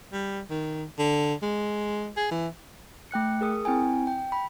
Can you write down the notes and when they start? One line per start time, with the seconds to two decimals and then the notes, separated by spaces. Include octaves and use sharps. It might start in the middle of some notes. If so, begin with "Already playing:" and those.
0.13 G3
0.50 D#3
0.99 D3
1.43 G#3
2.17 G#4
2.31 E3
3.11 A3 G5 F#6 C#7
3.41 G#4 A#4 D#6
3.65 C4 E4 G5 G#5
4.07 G5
4.32 B5